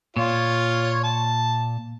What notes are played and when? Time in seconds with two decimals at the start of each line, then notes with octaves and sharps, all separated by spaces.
0.16 A#2 F4 C#5
1.03 A5